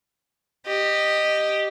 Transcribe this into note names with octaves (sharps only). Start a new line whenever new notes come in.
G4 D#5